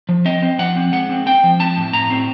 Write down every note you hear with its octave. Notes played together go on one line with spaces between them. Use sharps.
F3
C4 D#5
C4
F3 F#5
C4
G#3 F#5
C4
C4 G5
F3
C4 A5
A2
A2 A#5
C4